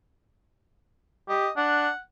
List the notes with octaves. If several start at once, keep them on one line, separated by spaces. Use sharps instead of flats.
G4 D#5
D4 F#5